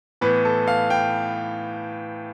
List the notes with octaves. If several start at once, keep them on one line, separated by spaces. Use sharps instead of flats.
A2 E3 B3 B4
A4
F5
G5